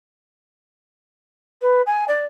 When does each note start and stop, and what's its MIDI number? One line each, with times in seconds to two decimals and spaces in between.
1.62 1.82 71
1.86 2.05 80
2.08 2.26 74